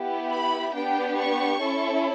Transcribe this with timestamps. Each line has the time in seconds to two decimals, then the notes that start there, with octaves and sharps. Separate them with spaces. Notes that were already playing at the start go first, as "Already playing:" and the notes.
Already playing: B3 E4 G4
0.31 B5
0.74 B3 D4 G4 G5
1.18 C#6
1.60 C#4 E4 A4